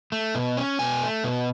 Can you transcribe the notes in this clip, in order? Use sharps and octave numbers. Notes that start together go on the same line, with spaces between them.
A3
B2
C#4
B2 G#5
A3
B2